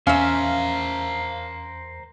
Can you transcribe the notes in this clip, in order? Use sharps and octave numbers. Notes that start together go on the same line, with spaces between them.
E2 C#4 A#4 C5 E5 F5